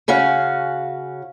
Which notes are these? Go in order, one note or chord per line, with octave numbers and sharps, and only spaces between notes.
C#3 C#4 F#4 F5